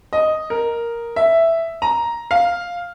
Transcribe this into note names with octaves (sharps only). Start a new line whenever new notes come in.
D#5
A#4
E5
A#5
F5